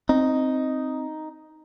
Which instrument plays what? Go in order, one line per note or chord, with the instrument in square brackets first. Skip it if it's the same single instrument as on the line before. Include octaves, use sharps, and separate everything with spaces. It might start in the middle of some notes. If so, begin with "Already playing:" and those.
[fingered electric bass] C4 [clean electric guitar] D#4